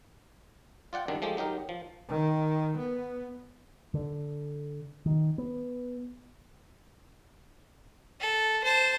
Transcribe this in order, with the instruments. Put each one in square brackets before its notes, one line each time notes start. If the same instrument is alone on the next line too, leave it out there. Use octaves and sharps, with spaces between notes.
[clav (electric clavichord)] F4 D5 F#5 G5
F#2 D#3 G3 D4
F3 G#3 A3 G4
F#3 D#4 G4 A#4
F3
[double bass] D#3
B3
[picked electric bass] D3
D#3
B3
[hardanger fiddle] A4
C5 A5